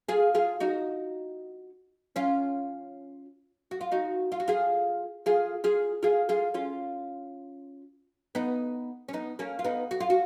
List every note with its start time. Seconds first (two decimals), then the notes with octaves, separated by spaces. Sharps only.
0.08 F4 G#4
0.35 F4 G#4
0.60 D#4 F#4
2.16 C#4 F4
3.71 F#4
3.81 F4
3.92 D#4 F#4
4.32 F4
4.40 F#4
4.48 F4 G#4
5.26 F4 G#4
5.64 F4 G#4
6.03 F4 G#4
6.29 F4 G#4
6.54 C#4 F4
8.35 B3 D#4
9.08 C#4
9.13 B3 D#4
9.39 A#3 C#4
9.59 F4
9.64 B3 D#4
9.91 F#4
10.00 F4
10.10 F#4